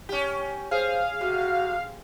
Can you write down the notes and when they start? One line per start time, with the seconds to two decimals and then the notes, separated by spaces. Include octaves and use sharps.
0.09 C#4 G4
0.71 G#4 C5 F5
1.21 C3 F#4